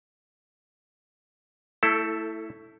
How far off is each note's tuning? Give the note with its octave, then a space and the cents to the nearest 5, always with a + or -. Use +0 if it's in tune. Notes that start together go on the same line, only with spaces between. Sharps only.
A3 +25 E4 +0 A4 +0